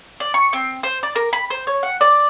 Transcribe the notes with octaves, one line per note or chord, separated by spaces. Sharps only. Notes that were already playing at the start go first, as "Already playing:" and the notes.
D5
C#6
C4
C5
D5
A#4
B5
C5
C#5
F#5
D5